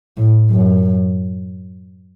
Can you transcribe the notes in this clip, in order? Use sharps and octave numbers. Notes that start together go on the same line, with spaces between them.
A2
F#2